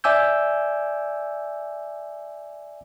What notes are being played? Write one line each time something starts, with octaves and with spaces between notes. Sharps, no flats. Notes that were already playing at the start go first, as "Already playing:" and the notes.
D5 E5 G#5 D6 E6 G6